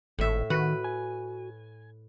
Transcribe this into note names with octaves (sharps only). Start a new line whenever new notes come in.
G#1 A2 E5
D#3 F#4 B4
G#5